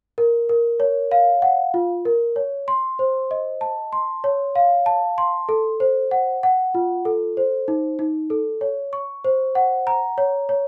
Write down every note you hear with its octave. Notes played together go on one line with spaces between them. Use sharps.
A#4
A#4
C#5
F5
F#5
F4
A#4
C#5
C6
C5
D#5
A5
C6
C#5
F5
A5
C6
A4
C5
F#5
F#5
F4
A4
C5
D#4
D#4
A4
C#5
C#6
C5
F#5
A#5
C#5
C#5